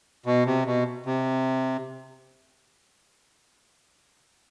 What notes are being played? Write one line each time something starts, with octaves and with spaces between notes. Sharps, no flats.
B2
C3
B2
C3